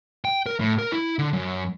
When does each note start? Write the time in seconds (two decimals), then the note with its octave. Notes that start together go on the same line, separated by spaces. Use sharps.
0.25 G5
0.46 A#4
0.60 A2
0.78 A#4
0.92 E4
1.19 D3
1.33 F#2